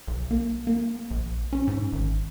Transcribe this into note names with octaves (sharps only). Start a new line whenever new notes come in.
B1
A#3
A#3
A#1
C#4
G#2
G#1